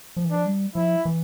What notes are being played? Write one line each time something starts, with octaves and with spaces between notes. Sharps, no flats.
F3
E3
F3 D4
G3
F3 E4
E3